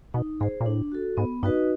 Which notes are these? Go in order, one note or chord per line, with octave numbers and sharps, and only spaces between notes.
B2 D#4
G#2 G#4 C5
A#2
A2 D4
F#4 A4
G#2 B3
G2 D#4 F#4 B4 D#5